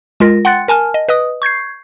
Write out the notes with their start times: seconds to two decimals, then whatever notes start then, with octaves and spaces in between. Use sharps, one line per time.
0.20 G#3 F4 A#4 A#6
0.45 F#5 G5 C6 F#6 A6 C#7
0.68 A#4 G#5 A5 F6
0.94 D#5
1.09 B4 D#5 D#6
1.42 C#6 G6 G#6 C7